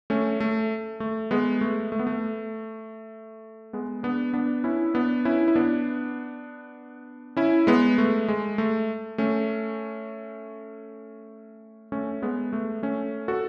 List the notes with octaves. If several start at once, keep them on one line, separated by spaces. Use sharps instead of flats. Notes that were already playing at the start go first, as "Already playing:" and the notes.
A3 C#4
A3
A3
G#3 B3
A3
A3
B3
A3
G#3 B3
B3 D4
B3 D4
C#4 E4
B3 D4
C#4 E4
E4
B3 D4
C#4 E4
G#3 B3
A3
G#3
A3
A3 C#4
A3 C#4
G#3 B3
A3
A3 C#4
F#4 A4